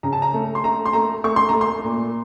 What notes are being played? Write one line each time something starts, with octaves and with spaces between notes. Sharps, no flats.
C#3 A#5
A5
A#5
A3
C6
A3 A#5
C6
A3 A#5
A3 C#6
C6
A#5
A3
C6
A#2